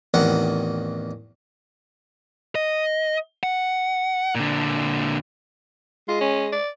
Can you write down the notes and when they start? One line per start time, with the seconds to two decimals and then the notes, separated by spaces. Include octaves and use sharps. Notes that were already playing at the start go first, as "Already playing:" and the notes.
0.14 A1 E2 D#3 C4 F#5
2.55 D#5
3.43 F#5
4.35 A#2 D3
6.08 G#3 F4
6.21 C#4
6.53 D5